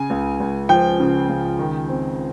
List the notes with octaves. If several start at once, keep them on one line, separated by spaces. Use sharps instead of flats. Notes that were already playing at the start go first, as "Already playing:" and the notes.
Already playing: C#3 G#5
C#2
C#2
F3 G5
C#3
C#2
D#3
C4